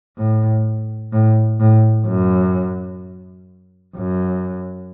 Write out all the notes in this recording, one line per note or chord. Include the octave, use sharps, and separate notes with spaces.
A2
A2
A2
F#2
F#2